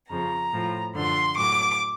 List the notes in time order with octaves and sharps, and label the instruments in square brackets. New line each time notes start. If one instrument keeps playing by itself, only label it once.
[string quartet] F2 C#3 F3 A#5
A2 F3
F#2 D3 F3 C6
A2 F#3 D6